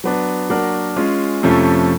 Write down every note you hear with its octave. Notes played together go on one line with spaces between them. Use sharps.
F#3 B3 D4
F#3 A#3 D4 F#4 A#4
G#3 C#4 F4
F2 C3 F3 A3 C#4